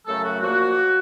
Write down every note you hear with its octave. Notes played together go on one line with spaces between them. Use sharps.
F#2 C#3 F#3 A3 A4
F#4
A#2 F3 A#3 F#4